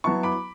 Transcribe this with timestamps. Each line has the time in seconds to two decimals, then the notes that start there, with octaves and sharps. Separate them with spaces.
0.04 F#3 B3 E4 A5 C#6
0.23 B5 D6